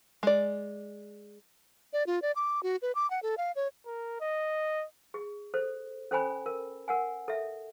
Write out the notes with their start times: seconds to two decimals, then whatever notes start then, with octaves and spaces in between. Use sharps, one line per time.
0.23 G#3 D5
1.93 D5
2.07 F4
2.22 D5
2.36 D6
2.63 F#4
2.82 B4
2.95 D6
3.10 F#5
3.23 A4
3.38 F5
3.56 C#5
3.86 A#4
4.21 D#5
5.14 G#4
5.54 A4 C5
6.11 C#4 A4 C5 G5 G#5 B5
6.46 A#4
6.88 A#4 F#5 G#5
7.28 A4 E5